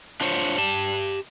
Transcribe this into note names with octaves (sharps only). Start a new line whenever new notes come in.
D4 F4 C5 C#5
G4 A5